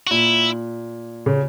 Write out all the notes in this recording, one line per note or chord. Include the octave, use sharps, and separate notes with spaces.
F#4
A#2 E4
C#3